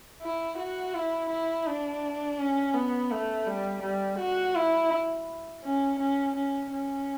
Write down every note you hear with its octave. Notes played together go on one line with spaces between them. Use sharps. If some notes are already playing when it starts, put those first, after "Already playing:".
E4
F#4
E4
E4
D4
C#4
B3
A3
G3
G3
F#4
E4
C#4
C#4
C#4
C#4